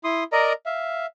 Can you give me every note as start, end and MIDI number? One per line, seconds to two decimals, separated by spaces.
0.04 0.24 64
0.04 0.24 84
0.04 0.24 87
0.32 0.53 70
0.32 0.53 74
0.32 0.53 75
0.32 0.53 82
0.66 1.06 76
0.66 1.06 77